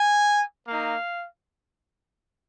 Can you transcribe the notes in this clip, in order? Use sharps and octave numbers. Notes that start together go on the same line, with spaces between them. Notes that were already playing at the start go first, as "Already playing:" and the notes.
Already playing: G#5
A#3 D#4 F5